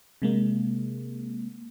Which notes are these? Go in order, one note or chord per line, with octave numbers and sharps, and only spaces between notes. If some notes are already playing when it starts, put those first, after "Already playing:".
C3 G#3 A#3